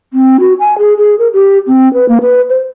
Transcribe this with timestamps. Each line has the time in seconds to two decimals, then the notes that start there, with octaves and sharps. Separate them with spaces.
0.13 C4
0.40 F#4
0.60 G#5
0.78 G#4
0.98 G#4
1.19 A#4
1.33 G4
1.67 C4
1.94 B4
2.08 A#3
2.21 B4
2.49 C5